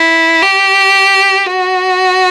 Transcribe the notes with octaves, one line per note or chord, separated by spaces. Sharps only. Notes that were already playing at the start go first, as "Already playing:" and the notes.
Already playing: E4
G4
F#4